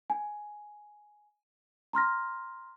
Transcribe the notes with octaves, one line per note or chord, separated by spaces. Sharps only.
G#5
A#5 C6 F6 A#6